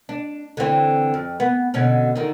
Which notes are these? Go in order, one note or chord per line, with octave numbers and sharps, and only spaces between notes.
D4
D3 E3 C4
F2
B3
B2 D3 C#4
D3 D#3